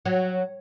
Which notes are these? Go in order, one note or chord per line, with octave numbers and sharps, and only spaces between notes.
F#3